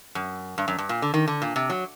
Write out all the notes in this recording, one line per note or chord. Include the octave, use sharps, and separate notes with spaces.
F#2
G2
F#2
G2
A#2
D3
D#3
D3
A#2
C3
F#3